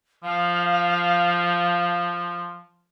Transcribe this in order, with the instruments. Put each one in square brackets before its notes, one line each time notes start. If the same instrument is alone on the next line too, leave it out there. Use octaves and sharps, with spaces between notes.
[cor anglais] F3 [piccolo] F5